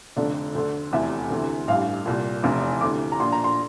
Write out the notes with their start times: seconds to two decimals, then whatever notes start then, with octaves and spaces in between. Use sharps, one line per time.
0.16 F1 F2 D3 D5
0.55 D2 D3
0.92 F1 E2 C3 E3 E5
1.31 D2 C3 E3
1.68 A1 G2 E3 F5
2.06 C2 A#2
2.43 F1 E2 C3 E3
2.81 D2 C3 E3 D6
3.12 A#5
3.20 A#1 A#2 C6
3.32 A#5
3.44 C6